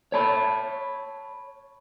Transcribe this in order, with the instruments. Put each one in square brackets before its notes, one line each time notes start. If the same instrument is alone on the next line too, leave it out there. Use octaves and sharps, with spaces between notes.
[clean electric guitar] C#5 A5 B5